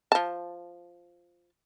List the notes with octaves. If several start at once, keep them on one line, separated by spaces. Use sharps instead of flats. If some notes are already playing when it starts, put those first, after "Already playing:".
F3 A5